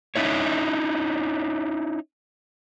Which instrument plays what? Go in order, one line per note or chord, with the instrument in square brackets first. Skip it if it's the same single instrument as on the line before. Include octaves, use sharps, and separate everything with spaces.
[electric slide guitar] C#4 D#4 E4 C#5